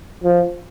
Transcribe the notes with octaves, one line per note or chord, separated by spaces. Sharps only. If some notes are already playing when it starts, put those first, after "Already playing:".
F3